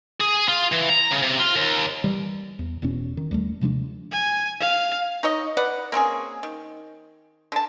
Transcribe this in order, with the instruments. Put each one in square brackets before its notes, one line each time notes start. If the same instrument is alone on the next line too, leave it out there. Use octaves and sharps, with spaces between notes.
[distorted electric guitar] G#4
F4
E3
A#5
C#3
C3
F4
D#2
[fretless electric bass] E3 G3
E2
E1 E2 B2 C#4
D#3
D#2 G3 A3
C3 F3 G#3 D4
[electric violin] G#5
F5
[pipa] D#4 C#5 D#5
B4 D5 F#5
A#3 C4 C#4 G#4
D#3
D3 A5